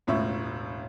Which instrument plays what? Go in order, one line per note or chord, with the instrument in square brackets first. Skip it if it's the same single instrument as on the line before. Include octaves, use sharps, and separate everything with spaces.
[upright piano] E1 C#2 A2 E5 C#6